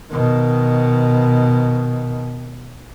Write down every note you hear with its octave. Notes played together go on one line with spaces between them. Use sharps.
B2 D#3